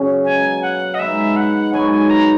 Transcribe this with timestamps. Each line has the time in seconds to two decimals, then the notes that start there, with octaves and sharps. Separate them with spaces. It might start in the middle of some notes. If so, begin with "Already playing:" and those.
Already playing: C#3 F#3 G#4
0.25 B2 A#3 C#4 G#5
0.62 F#5
0.94 D#5
0.99 G#3 B3 D#4 E5
1.36 F#5
1.73 G#2 F#3 B3 G#5
1.91 G#5
2.10 A#5